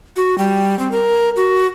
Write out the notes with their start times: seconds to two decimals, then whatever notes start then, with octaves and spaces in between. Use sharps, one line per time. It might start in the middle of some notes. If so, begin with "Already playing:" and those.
0.16 F#4
0.38 G3
0.79 C4
0.91 A#4
1.36 F#4